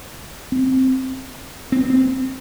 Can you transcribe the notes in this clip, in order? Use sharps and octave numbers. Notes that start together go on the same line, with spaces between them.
C4
C4
B3
C4